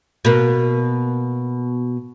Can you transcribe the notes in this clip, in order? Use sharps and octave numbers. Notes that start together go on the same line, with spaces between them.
B2 A#3